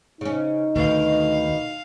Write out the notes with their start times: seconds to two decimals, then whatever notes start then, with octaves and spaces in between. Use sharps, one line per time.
0.21 C#3 C#4 D#4
0.76 D2 B2 D#3 F5